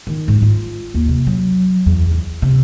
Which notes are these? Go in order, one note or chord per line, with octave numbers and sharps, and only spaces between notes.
D#3
G#2
F4
D#2
C3
F#3
E2
E2
C3